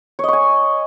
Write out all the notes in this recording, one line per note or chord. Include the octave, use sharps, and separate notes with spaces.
C#5 D#5 G#5 C#6